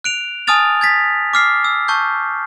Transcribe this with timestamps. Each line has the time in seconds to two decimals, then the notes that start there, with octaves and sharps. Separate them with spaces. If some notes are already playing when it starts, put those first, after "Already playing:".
0.04 F#6 D7 F7
0.47 G#5 A5 D#6 F6 A6 F7
0.81 G#6 A6 B6
1.34 D6 F6 C7
1.64 E6
1.88 A5 C#6 E6 G6